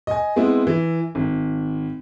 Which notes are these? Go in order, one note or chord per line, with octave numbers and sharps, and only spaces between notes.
D#5 G#5
G#3 B3 C4 E4
E3
G#1